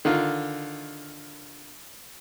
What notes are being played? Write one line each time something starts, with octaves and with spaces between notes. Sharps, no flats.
D3 D#3 F4